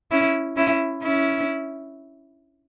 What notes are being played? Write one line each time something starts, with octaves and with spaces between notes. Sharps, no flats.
C#4 E4
C#4 E4
C#4 E4